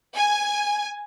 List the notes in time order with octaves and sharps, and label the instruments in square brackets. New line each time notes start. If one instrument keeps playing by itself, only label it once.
[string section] G#5